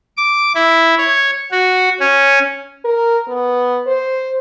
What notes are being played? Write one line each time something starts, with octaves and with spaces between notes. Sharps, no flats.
D6
E4
C#5
F#4
C#4
A#4
B3
C5